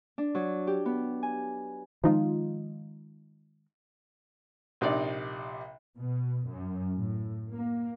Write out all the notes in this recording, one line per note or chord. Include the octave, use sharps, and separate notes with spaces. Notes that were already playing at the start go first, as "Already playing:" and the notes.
D4
F#3
G4
B3
G#5
D#3 F3 G#3 D#4 F4
A#1 C3 D#4 D5
B2
F#2
A2
A#3